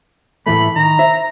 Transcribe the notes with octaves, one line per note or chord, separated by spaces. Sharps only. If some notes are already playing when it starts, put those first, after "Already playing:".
A2 E3 A3 B5
D#3 A#5
C5 E5